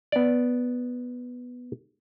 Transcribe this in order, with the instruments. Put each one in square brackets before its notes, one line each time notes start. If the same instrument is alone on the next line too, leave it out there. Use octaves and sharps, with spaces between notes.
[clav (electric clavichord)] B3 D5